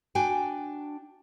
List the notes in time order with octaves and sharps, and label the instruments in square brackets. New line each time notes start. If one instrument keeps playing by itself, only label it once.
[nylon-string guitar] D4 F#4 G5 G#5